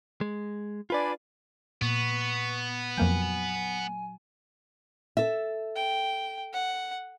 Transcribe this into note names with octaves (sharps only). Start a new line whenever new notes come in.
G#3
D4 F4 B4 D5 G#5 B5
A#2 B3 C#6
F2 F#3 A#3 G5 G#5
A4 E5
G5
F#5